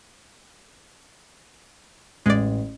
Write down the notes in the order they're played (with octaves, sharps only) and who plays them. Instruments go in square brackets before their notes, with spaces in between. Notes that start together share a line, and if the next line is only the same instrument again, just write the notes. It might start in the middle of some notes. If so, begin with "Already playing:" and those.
[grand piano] A1 [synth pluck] G#3 D5